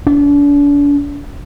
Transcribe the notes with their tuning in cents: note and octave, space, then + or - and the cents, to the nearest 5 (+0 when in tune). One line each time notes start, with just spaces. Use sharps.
D4 -40